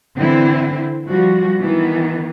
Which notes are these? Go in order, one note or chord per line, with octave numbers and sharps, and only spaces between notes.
D3 E3 C4 E4
F3 G3 F#4
D#3 E3 B3